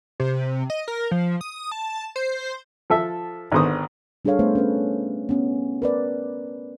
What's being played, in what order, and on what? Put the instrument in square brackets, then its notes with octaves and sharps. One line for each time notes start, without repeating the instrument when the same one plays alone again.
[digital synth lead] C3
D#5
A#4
F3
D#6
A5
C5
[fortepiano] F3 A4 E5
G#1 D3 B3 C5 C#6 D#6
[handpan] G3 D4 G#4 A4 C#5 F5
A3 B3 B4 C5
C#4 B4
B3 C#4
A#4 B4 D5